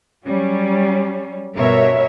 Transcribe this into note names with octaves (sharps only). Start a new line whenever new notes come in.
F#3 G3 C#4
G2 B2 A#4 C#5 E5